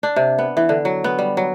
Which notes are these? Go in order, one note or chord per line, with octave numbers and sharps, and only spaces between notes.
D4
C3
B3
E3
D3
F#3
B3
G3
F#3